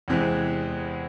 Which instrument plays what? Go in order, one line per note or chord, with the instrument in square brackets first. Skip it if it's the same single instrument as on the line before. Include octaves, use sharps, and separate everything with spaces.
[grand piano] E2 C3 E3 G#3 C4